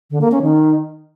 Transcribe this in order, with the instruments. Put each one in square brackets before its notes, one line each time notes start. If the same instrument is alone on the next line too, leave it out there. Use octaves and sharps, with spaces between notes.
[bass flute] D3
A#3
C#4
D#3